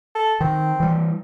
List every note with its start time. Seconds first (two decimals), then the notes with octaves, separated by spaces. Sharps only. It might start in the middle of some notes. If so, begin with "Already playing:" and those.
0.15 A4
0.40 D#3 C4
0.80 E3 G3